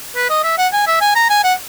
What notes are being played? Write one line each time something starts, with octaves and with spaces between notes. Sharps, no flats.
B4
D#5
E5
F#5
G#5
E5
G#5
A#5
G#5
F#5